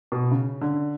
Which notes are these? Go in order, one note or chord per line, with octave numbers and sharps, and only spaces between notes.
B2
C#3
D3